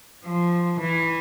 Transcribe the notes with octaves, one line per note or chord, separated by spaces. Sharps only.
F3
E3